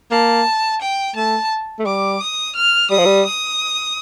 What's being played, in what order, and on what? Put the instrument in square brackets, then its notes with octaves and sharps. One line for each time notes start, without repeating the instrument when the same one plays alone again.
[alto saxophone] A#3 [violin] A5
[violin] G5
[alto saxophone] A3 [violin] A5
[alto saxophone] A3
[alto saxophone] G3 [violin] D6
[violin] D#6
F6
[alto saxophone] G3 [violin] D#6
[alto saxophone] F3
G3
[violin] D#6